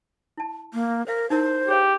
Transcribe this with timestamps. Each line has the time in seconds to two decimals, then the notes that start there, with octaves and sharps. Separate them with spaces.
0.37 E4 A5
0.74 A#3
1.07 A#4 C5 F5
1.30 D#4 E4 A#4 C5
1.68 G4 G#4 C#5 F5